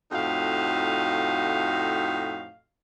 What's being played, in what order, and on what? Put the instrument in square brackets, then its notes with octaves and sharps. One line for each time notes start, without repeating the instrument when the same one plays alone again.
[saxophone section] F2 A2 D#4 F#4 F5